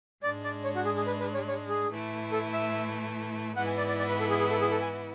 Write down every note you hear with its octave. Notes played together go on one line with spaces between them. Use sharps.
G#2 G#3 D4 D5
D5
C#5
F#4
G#4
G#4
B4
B4
C#5
C#5
G#4
A2 E3 A3 E4
A4
E5
G#2 E3 B3 E4 F#5
G#5
D5
D5
D5
B4
A4
G#4
G#4
A4
G#4
A4
G#5